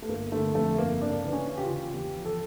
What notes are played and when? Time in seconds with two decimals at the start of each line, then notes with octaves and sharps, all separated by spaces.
0.02 A3
0.09 G1 A#3
0.32 D3 A3
0.55 F2 A3
0.78 G1 A#3
1.01 C#3 D4
1.25 E3
1.33 C#4
1.48 C#3
1.57 G4
1.63 F4
1.70 C#3
1.93 E2 G4
2.17 F3
2.25 A4